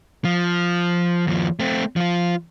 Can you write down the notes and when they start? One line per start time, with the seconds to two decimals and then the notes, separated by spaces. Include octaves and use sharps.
0.25 F3
1.27 D#2 F3
1.60 A3 C4
1.96 F3 F4